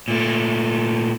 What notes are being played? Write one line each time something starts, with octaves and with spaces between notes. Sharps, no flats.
A#2 A3